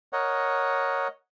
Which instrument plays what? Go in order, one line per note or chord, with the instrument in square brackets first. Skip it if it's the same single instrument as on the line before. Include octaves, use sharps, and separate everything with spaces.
[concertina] A#4 C#5 D#5 F#5